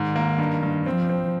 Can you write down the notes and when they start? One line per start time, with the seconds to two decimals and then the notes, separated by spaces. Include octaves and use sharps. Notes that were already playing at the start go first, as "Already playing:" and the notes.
Already playing: G#2 D#3
0.16 A#3
0.38 G2
0.63 G2
0.86 F3 C4
1.10 C4